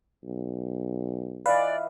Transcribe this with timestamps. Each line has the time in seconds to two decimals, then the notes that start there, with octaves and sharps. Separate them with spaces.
0.24 B1
1.46 E3 F4 B4 D5 D#5 F5